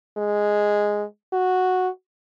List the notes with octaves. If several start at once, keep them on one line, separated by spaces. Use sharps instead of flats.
G#3
F#4